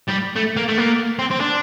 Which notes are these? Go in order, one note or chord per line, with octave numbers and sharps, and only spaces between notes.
G3
A3
A#3
A3
A#3
C4
C4
D4